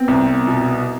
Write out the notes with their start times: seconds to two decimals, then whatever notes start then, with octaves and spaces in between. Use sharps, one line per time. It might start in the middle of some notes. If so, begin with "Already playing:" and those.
Already playing: B3 C4
0.08 C2
0.47 B2